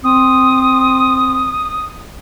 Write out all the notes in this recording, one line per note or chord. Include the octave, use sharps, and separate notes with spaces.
C4 D#6